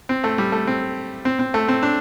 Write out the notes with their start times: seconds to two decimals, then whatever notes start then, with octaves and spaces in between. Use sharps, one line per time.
0.09 C4
0.24 A3
0.38 G3
0.52 A3
0.67 C4
1.25 C4
1.39 C4
1.54 A3
1.68 C4
1.83 D4